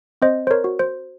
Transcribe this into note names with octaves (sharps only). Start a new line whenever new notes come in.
C4 C5 D#5
C5
A#4 C#5
F#4
C5